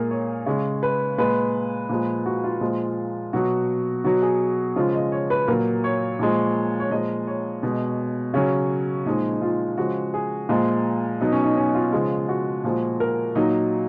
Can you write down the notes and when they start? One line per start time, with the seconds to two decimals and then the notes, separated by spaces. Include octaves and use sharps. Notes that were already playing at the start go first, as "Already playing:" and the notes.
Already playing: A#2 G#3 G#4 A#4
0.11 C#5
0.46 C#3 G#3
0.83 B4
1.18 A#2 G#3 B4
1.89 A#2 F3 G#3
2.26 F#4
2.44 F4
2.61 A#2 F3 G#3
3.33 B2 F#3 F#4
4.04 B2 F#3 F#4
4.22 G#4
4.76 C#3 F3 G#3 F4
4.94 D#5
5.12 C#5
5.30 B4
5.48 A#2 F#3 A#4
5.84 C#5
6.19 A#2 F3 G#3
6.80 C#5
6.90 A#2 F3 G#3 D#5
7.27 C#5
7.63 B2 G#3
8.34 C#3 F#3 C#4
9.06 A#2 F3 G#3 D#4
9.33 D#4
9.42 F4
9.78 C#3 F3 G#3 F#4
10.14 G#4
10.49 A#2 F3 G#3
11.21 B2 F#3 D#4
11.32 C#4
11.44 D#4
11.57 C#4
11.74 F4
11.93 C#3 F3 G#3
12.29 F#4
12.64 A#2 F3 G#3
13.00 A#4
13.35 A#2 F#3 D#4